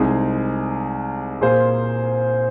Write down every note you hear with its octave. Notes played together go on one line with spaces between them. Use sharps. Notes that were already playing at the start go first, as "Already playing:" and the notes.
Already playing: C2 C3 G#3 D#4 G#4
A#2 A#3 G#4 C5